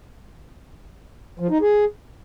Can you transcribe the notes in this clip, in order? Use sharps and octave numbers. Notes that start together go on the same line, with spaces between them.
F3
D#4
G#4